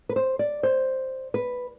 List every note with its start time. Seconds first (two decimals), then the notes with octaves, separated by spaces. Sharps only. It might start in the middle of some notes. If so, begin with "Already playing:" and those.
0.09 B4
0.16 C5
0.39 D5
0.63 C5
1.34 B4